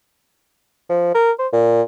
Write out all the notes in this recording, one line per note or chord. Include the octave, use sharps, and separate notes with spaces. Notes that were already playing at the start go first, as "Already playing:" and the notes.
F3
A#4
C5
A#2